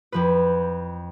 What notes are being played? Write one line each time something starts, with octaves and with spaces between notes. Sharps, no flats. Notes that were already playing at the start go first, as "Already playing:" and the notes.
F2 F3 B4